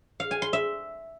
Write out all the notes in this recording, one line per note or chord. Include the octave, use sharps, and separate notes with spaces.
F5
G#5
C6
E5